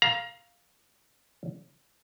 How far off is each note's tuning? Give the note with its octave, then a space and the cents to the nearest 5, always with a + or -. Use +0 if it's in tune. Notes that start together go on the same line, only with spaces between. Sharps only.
F5 +0 A#5 +25